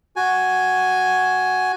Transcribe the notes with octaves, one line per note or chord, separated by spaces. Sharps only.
F#4 G#5